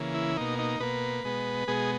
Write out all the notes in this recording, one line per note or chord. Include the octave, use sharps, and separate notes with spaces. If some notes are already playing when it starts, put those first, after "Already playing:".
Already playing: C#3 E3 A#3
E4
B2 A#3 D#4
D#4
B2 A#3 B4
B2 G#3 B3
B2 G#3 B3 G#4